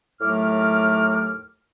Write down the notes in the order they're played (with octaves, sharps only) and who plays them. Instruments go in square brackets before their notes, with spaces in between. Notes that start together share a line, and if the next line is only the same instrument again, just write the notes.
[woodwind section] D#2 A2 F#3 A3 D6 F6